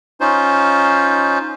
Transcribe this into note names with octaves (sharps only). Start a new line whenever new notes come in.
C#4 D#4 F4 C5